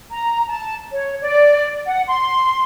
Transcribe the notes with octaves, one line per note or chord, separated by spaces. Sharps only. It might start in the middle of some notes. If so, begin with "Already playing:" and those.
A#5
A5
C#5
D5
F#5
C6